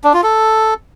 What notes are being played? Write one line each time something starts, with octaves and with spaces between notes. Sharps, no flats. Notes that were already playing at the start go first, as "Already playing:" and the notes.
D4
F4
A4